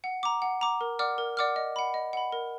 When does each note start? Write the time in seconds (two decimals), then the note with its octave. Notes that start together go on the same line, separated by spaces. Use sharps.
0.04 F#5
0.23 A#5 D6
0.42 F#5
0.61 A#5 D6
0.81 A#4
0.99 D5 F#5 D6 F6
1.18 A#4
1.37 D5 F#5 D6 F6
1.56 D#5
1.76 F#5 B5
1.94 D#5
2.13 F#5 B5
2.32 A#4